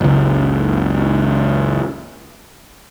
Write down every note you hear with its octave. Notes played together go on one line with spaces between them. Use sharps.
F#1 C#2